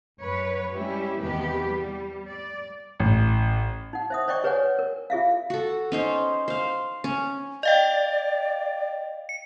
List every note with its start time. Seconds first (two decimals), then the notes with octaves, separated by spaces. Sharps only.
0.20 F#2 B4 C#5
0.74 G3 G#3 C#4 E4 G4
1.21 E2 C3 D#3 B3 G4 B4
1.67 G3
2.30 D5
3.00 A1
3.93 D#4 F#5
4.10 C5 E5 D#6
4.28 C5 D5 D#5 G5 C#6 D6
4.44 G#4 B4 C#5 D5 F#5 G#5
4.79 A#4
5.10 F4 G#4 E5 F5
5.50 F#4 A4
5.92 C#4 D#4 C5
6.48 C5 F5
7.04 C#4
7.63 D5 D#5 F5 G5
9.29 C#7